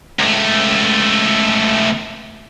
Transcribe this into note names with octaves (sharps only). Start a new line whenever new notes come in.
C#2 A3